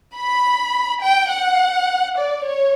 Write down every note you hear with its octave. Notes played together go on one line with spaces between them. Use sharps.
B5
G5
F#5
D5
C#5